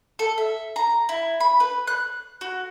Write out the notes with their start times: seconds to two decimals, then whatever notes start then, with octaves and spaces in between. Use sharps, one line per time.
0.19 A4
0.38 E5
0.76 A#5
1.09 E4
1.41 B5
1.60 B4
1.88 F#6
2.41 F#4